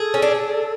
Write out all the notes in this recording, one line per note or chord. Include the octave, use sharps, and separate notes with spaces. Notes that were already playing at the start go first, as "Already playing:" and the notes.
Already playing: G#4 A4
C#4
D4